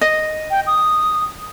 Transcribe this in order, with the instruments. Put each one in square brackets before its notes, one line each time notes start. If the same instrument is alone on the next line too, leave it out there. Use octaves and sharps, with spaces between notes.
[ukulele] D#5
[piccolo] G5
D#6